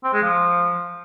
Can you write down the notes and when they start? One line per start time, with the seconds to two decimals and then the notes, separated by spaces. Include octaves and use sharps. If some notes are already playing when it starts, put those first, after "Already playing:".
0.04 C4
0.13 G#3
0.22 F3